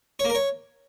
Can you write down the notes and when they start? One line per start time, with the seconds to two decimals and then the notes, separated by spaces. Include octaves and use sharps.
0.19 C#5
0.25 A#3
0.30 A#4
0.35 C#5